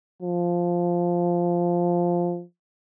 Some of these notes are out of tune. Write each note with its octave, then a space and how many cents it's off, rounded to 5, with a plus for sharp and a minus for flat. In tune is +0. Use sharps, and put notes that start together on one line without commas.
F3 +0